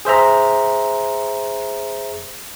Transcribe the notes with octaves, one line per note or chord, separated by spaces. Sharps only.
G#4 C5 E5 A#5